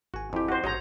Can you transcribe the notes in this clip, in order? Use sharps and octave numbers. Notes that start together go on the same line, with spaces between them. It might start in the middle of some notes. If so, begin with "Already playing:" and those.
G#1 F#4 G#5
F2 E4 G4
F#4 C5
A1 G#2 F#4 C#5 D#5 A#5 G6